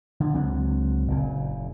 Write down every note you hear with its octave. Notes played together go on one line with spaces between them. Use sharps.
D3
C#2 F#3 C4 D4
F#1 A#2 C#3